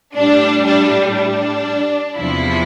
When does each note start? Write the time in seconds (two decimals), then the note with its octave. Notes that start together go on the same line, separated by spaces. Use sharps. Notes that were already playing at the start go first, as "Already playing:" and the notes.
0.15 A2 G3 D4
0.66 D4
1.16 D4
2.16 E2 C3 F3 E4